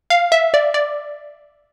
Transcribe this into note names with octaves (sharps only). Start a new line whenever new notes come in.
F5
E5
D5
D5